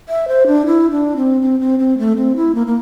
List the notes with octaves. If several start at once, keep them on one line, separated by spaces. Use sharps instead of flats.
E5
C5
D4
E4
D4
C4
C4
C4
C4
A3
C4
E4
A#3
A#3